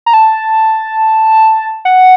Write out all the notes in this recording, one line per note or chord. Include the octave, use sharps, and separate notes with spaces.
A#5
A5
F#5